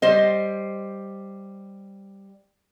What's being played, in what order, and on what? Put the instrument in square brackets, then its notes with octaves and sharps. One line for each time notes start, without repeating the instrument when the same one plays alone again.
[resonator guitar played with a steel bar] G3 C5 D#5